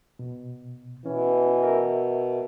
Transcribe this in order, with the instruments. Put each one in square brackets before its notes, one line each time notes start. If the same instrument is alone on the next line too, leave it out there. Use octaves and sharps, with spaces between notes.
[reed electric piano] B2
[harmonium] B2 [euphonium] E3 [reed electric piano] C#4
[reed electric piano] A#4 E5